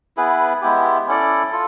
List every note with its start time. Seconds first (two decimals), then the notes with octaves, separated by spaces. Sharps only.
0.17 B3 E4 G#4 B4
0.62 G#3 B3 E4 G4
1.08 C#4 E4 A4 D5
1.52 F4 A4